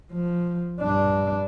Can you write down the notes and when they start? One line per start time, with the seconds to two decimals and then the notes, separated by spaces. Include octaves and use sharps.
0.12 F3
0.81 G2 D4